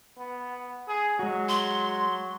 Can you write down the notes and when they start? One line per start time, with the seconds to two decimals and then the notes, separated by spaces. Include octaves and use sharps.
0.18 B3
0.88 G#4
1.19 F#3 G#3 F#4
1.49 C6